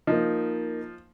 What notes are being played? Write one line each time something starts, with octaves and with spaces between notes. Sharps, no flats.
F3 A#3 D#4 D#5